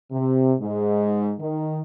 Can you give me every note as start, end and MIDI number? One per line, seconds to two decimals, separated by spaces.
0.12 0.54 48
0.60 1.33 44
1.39 1.81 51